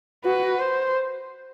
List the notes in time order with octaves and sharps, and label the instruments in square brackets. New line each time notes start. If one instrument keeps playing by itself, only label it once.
[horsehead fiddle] F#4 [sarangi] B4
[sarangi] C5